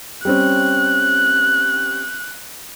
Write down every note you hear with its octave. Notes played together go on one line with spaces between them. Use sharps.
G3 C4 C#4 F#6